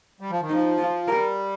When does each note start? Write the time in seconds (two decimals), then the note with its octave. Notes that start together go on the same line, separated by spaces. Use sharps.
0.20 G3
0.30 F3
0.41 D#3
0.49 F3 D#4
0.78 F4
1.07 G3 A#4